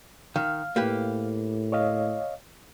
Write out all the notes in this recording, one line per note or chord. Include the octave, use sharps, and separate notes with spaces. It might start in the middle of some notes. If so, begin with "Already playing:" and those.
D#3 F5 F6
A2 A#3 G4 B4
C#5 D#5 F5